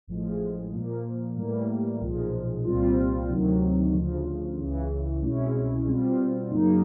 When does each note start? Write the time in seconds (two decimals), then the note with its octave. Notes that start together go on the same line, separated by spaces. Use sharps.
0.07 A1 A2 F3 G#3
0.72 A#2 F3 A#3
1.36 A2 E3 G3 A#3
2.01 B1 A#2 F3 G#3
2.64 C2 A#2 G3 C4 F4
3.29 D2 C3 D#3 F#3
3.93 D2 C#3 F3
4.58 C#2 C#3 E3
5.21 C2 B2 G#3 C#4 E4
5.86 B2 G3 C4 F4
6.50 F#2 C#3 F#3 A#3 D#4